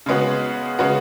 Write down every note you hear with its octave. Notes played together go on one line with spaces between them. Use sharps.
C#3 G#3 B3 F#4
C#3 G#3 B3 F#4